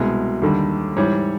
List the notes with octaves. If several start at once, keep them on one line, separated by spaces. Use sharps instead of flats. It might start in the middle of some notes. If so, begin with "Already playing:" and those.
Already playing: C2 B2 G#3
D#2 D3 G3
G#2 E3 G3 C#5